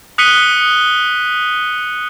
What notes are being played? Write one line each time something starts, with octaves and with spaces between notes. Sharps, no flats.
D#6 F#6 B6 C#7 D#7 G7